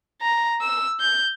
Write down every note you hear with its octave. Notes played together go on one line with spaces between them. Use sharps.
A#5
E6
G6